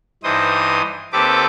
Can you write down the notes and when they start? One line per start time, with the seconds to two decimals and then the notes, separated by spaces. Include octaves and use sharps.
0.23 G2 E3 D#4 C5 D#6
1.13 D#2 C4 G4 A4 B4 D6